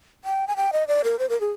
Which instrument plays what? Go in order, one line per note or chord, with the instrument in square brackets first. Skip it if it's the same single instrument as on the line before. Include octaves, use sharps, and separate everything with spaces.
[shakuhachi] G5
G#5
G5
D#5
D5
A#4
C5
A#4
G#4